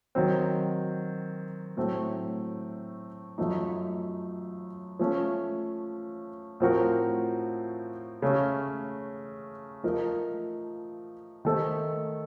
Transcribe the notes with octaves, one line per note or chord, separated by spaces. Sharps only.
D#3 F#3 C4
A2 F#3 A3 C4
F#2 F3 A3 D#4
F3 A3 C#4
A2 F3 C4 F#4 A#4
C#3 A3 C#4
F3 A3 D#4 A#4
D#3 A3 D#4 A4 C5